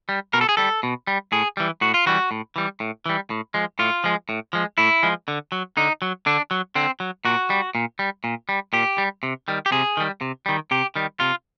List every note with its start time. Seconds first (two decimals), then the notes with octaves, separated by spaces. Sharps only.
0.09 G3
0.33 B2 A#4
0.41 A4
0.49 G#4
0.57 G3 A4
0.83 B2
1.07 G3
1.32 A2 G#4
1.57 E3 G3
1.81 A2 F#4
1.94 F4
2.06 E3 G3 F#4
2.31 A2
2.56 E3 G3
2.80 A2
3.06 E3 G3
3.30 A2
3.54 F3 G#3
3.79 A2 F4
4.04 F3 G#3
4.29 A2
4.53 F3 G#3
4.78 A2 E4
5.03 F3 G#3
5.28 D3
5.52 F#3
5.77 D3 D#4
6.02 F#3
6.26 D3 D4
6.51 F#3
6.75 D3 C4
7.00 F#3
7.25 A#2 F#4
7.50 G3
7.75 A#2
7.99 G3
8.24 A#2
8.49 G3
8.73 A#2 G4
8.98 G3
9.23 C3
9.48 D#3 G3
9.66 G4
9.72 C3 G#4
9.97 D#3 G3
10.21 C3
10.46 D#3 G3
10.71 C3 G4
10.96 D#3 G3
11.20 C3 F4